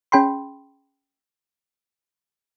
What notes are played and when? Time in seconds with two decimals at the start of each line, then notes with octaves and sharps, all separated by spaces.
0.12 C#4 G#4 G5 B5 C6